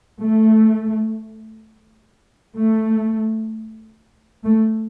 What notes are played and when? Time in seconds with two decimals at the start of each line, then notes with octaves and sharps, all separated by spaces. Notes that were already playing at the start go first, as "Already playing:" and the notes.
0.21 A3
2.56 A3
4.44 A3